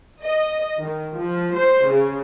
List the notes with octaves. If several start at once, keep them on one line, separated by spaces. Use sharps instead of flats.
D#5
D#3
F3
C5
C#3